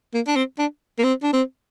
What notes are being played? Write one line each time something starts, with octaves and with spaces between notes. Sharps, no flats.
A#3
D4
C4
D4
A#3
C4
D4
C4